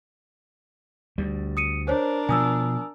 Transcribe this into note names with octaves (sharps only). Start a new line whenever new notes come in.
D2 G3
D#6 C#7 D#7
D4 A#4 C5 C#5
B2 F3 G#5 D#6 E6